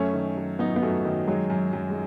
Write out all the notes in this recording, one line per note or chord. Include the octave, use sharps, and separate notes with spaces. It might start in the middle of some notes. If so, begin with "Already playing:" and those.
Already playing: F#2 A3 C#4
D#3
F#3
F#2 B3 D#4
B3
F#2 F#3 A3
D#3
F#3 G#3
F#2
F#2
G#3